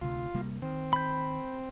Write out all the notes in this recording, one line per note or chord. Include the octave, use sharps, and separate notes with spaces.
D2 C3 F4
C3 G3 A#3
D#3 C4
B5 G6